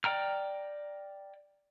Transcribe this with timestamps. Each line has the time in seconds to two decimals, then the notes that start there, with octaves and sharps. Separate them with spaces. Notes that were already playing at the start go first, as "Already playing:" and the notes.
0.04 D5 G5 A#5 F6